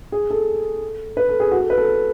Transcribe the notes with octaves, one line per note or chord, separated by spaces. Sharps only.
G#4
A4
B4
A4
G#4
F#4
A4
B4
A4